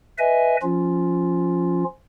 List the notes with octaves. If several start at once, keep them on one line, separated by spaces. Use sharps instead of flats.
B4 D#5 E5 G#5
F3 C#4 F4